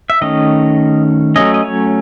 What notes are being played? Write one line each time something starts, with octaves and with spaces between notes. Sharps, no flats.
E5
D#3 A3 C#4 D#5
F#3 A3 C#4 D#5
D#5
C#5